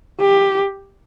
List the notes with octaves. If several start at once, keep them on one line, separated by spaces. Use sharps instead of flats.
G4